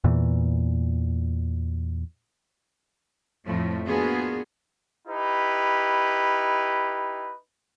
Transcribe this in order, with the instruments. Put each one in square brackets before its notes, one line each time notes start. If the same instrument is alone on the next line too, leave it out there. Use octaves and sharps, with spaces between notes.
[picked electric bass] E2 A#2 E3
[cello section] F2 A2 F3 A3
A#3 B3 D4 F4 F#4 G#4
[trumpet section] D#4 E4 G4 B4